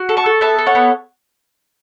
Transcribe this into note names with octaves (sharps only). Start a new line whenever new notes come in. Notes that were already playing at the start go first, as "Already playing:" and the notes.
Already playing: F#4
A4
A5 C#6
A4
B3 E5 A5
A4
C#5 F#5
B3